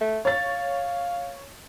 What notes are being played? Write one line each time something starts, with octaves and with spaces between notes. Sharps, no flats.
A3
C#5 F5 A6